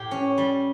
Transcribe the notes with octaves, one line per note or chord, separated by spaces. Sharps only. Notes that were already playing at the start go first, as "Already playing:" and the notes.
Already playing: A2 G4
C#4
G3